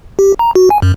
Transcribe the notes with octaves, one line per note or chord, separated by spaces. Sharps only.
G4
A#5
F#4
G#5
F#2